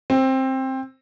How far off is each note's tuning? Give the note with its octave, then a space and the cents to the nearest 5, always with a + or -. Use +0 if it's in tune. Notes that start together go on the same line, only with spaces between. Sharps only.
C4 +15